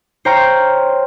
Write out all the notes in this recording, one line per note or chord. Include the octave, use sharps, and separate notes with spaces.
C5 C#5 G5 A#5 F6 G6